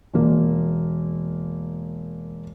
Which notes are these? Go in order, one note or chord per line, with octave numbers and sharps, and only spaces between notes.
E1 A#3